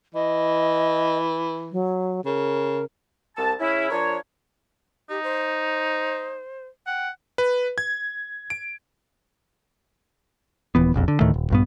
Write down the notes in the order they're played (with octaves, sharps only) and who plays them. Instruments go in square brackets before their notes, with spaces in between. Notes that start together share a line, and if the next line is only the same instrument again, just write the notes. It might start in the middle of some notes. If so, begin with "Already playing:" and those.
[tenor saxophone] E3 [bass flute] D#5
[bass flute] F#3
[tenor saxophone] C#3 [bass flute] A#4
[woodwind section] C2 A5
C#3 C#4 E4
F3 D4 A#4 C#5
[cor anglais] D#4 [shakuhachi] G4
[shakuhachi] C5
[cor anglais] F#5 [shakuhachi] G5
[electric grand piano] B4
G#6
D7
[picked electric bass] D#1 E3 B3
E1 A#1 F2
D3
D2 A2 D#3 A3
D#1
A#1 G2 B3